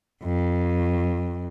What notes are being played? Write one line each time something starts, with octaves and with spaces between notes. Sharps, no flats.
F2